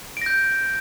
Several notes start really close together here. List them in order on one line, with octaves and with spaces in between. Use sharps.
D7 A#6 G6